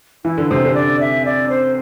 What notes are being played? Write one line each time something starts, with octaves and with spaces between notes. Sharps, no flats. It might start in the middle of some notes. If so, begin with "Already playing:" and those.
E3 E4
D3
C3 C5
D3
D5
E5
D5
C5